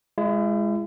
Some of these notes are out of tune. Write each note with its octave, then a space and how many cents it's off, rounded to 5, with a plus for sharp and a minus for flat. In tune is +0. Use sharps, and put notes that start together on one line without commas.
G#3 +0 E4 +40